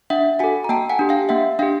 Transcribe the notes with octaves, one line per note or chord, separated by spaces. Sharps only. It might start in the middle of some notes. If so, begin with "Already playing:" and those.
D4 E5 F#5
F#4 A4 F#5 G#5
A#5
A#3 G5 A5
F#5 G#5
D4 G4
F5 G5
A#3 E5 F#5
D4 G4 F5 G5